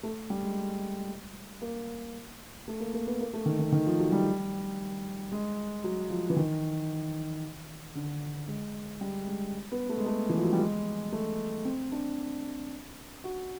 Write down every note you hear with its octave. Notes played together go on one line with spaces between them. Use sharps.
A3
G3
G#3
A#3
A3
A#3
A#3
B3
A#3
A3
D#3
D#3
D#3
F3
F#3
G3
G#3
F#3
F3
E3
D#3
D3
G#3
G3
G#3
B3
A3
G#3
A3
E3
F3
F#3
G3
G#3
A3
C4
D4
F#4